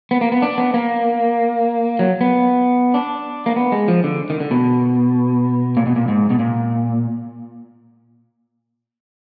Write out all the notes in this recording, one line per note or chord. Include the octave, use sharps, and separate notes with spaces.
B3
A#3
B3
D4
B3
A#3
F#3
B3
D4
A#3
B3
G#3
F3
D3
D#3
D3
B2
A#2
B2
A#2
G#2
B2
A#2